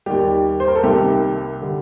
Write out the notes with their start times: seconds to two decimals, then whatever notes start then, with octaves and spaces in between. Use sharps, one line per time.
0.06 D#2 D#3 G3 G4
0.60 C5
0.68 A#4
0.75 A4
0.83 C2 C3 D#3 A#3 G4
1.61 D3 G3